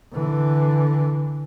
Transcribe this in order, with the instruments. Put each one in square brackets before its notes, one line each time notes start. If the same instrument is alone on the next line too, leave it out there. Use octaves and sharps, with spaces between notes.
[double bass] D3 E3